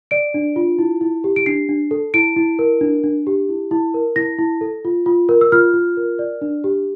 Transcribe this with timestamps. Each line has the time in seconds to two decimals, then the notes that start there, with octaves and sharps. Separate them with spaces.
0.11 D5 D7
0.34 D4
0.56 F4
0.79 E4
1.01 E4
1.24 G4
1.36 D7
1.46 D4 C7
1.69 D4
1.91 A4
2.14 E4 D7
2.36 E4
2.59 A#4
2.81 D4
3.03 D4
3.27 G4
3.49 E4
3.71 E4
3.94 A#4
4.16 E4 A#6
4.38 E4
4.61 A4
4.85 F4
5.06 F4
5.29 A#4
5.41 E6
5.52 F4 F6
5.74 F4
5.97 A#4
6.19 D5
6.41 D4
6.64 G4